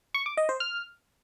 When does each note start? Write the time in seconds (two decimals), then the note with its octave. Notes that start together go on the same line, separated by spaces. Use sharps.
0.14 C#6
0.26 D6
0.37 D#5
0.49 C5
0.60 F6